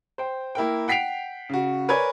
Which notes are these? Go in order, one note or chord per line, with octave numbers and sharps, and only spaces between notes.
C5 G5
A#3 E4 A#4 G5
F#5 G5 B6 C7 D7 F7
C#3 F#4
A#4 B4 C#5 D5 G#5 G#6